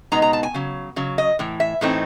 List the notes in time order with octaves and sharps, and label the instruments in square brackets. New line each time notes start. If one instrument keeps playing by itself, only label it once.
[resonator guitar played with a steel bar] B2 G#3 B3 D#4 A#5
A#5
A5
G#5
C#3 F#3
C#3 F#3
D#5
A2 E3
E5
A2 E3 A3 C4 D#4